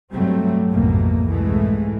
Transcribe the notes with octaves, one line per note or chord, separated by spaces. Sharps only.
G2 B2 F#3 G3 A3 C4
A#1 F2 G#2 B2 A3 A#3
C2 G#2 E3 G#3 A3